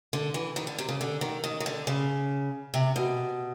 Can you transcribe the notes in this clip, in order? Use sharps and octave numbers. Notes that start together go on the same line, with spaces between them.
D3
E3
D#3
D3
C3
C#3
D3
D#3
D#3
D#3
D3
C#3
C3
B2